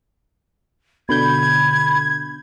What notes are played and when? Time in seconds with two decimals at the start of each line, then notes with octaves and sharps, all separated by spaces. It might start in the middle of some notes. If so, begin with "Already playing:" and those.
1.09 B2 D3 B5 G6 G#6